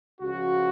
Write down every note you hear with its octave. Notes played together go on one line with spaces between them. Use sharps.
C#2 C#3 F3 F#4